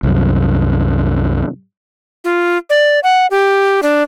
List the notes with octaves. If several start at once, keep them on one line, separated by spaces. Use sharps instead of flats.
C2 F#2
F4
D5
F#5
G4
D4